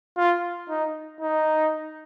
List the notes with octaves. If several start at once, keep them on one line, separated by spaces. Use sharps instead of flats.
F4
D#4
D#4